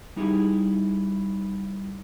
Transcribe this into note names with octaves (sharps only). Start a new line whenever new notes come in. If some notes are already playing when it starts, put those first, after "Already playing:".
G3 D#4 E4 G4 G#4